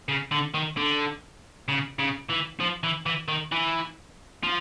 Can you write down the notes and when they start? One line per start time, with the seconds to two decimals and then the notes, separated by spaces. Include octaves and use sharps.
0.09 C#3
0.31 D3
0.54 D#3
0.77 D3
1.68 C#3
1.99 C#3
2.30 E3
2.60 F3
2.83 E3
3.06 E3
3.28 D#3
3.52 E3
4.43 F3